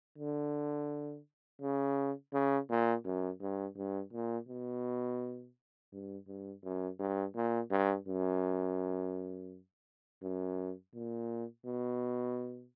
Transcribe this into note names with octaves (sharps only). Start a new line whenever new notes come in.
D3
C#3
C#3
A#2
F#2
G2
G2
A#2
B2
G2
G2
F#2
G2
A#2
G2
F#2
F#2
A#2
B2